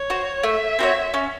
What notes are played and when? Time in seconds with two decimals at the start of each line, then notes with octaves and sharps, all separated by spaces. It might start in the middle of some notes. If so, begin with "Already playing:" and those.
Already playing: C#5
0.10 F#4 C5
0.43 A3 E5
0.79 C4 F#4 C#5
1.14 C#4